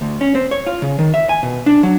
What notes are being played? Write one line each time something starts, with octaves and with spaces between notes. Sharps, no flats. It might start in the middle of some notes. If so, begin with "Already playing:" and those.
D2
C#4
C4
C#5
F4
C#3
D#3
E5
G#5
B2
D4
F#3